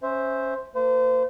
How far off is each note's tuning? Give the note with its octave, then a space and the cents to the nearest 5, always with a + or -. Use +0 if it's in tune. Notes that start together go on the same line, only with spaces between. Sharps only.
C#4 -15 C5 +0 E5 -10
A#3 -30 C5 -35